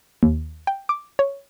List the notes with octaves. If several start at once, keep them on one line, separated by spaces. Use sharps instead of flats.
D#2
G5
D6
C#5